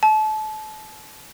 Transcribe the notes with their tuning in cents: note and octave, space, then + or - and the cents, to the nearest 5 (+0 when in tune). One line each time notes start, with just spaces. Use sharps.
A5 -30